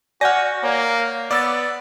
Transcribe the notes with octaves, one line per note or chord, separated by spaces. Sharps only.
F#4 D5 F#5 G#5 F6 G6 A#6
A#3 C#5
B3 D5 D6 E6 A6